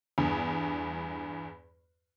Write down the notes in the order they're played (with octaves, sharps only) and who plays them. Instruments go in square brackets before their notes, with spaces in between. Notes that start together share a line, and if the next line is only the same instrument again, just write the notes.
[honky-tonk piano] E2 G2